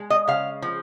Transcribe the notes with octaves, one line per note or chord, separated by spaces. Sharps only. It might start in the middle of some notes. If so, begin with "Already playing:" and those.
Already playing: G#3
D#5
C#3 F5
F3